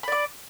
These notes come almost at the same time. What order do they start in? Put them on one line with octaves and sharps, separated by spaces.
B5 D5 D6